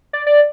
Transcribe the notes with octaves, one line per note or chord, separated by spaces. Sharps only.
D5
D5